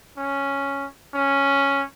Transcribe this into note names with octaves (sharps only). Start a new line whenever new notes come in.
C#4
C#4